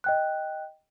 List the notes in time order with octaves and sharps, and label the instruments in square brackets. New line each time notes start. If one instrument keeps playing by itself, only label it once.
[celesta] D#5 G5 F#6